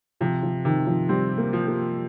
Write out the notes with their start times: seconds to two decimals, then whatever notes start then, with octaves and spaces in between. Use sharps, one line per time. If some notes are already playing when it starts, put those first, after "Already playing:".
0.20 C3 F3
0.43 F3
0.65 C3 D#3
0.87 F3
1.09 G3 C4
1.38 A#3
1.53 F3
1.67 A#3